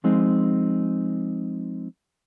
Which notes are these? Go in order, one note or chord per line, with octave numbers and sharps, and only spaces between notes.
F3 G#3 C4 D#4